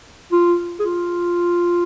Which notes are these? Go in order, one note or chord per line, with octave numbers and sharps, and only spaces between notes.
F4
G#4
F4